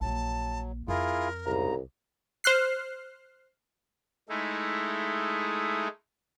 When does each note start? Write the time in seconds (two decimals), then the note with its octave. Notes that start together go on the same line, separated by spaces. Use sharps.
0.01 A#1 F#3 A#3 A5
0.88 F2 E4 F4 G#4 A#4
1.46 C2 G#2 C#3 A#5
2.44 C5 F6 F#6 C7
4.29 G#3 A3 D#4 E4